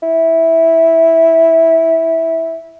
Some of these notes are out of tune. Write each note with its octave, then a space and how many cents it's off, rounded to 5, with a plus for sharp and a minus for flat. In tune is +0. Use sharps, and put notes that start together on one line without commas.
E4 -10